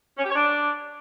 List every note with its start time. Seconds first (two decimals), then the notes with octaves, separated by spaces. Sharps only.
0.18 C#4
0.24 G4
0.29 C#5
0.35 D4